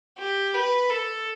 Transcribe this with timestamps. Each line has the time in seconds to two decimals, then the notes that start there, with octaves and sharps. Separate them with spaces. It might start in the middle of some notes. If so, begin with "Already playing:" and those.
0.19 G4
0.54 B4
0.90 A4